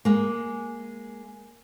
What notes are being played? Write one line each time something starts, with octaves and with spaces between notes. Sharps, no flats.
G#3 A#3